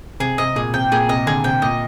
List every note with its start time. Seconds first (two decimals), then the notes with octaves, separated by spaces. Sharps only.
0.20 C3 G#4
0.38 C3 D#5
0.55 A#2 G#4
0.73 C3 G5
0.91 A#2 G#4
1.09 C3 D#5
1.26 D3 G#4
1.44 C3 G5
1.62 A#2 D#5